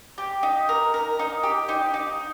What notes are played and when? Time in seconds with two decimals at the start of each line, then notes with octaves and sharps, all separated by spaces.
0.18 G4
0.43 D#4
0.69 A#4
0.94 A#4
1.19 D#4
1.43 G4
1.69 D#4
1.94 D#4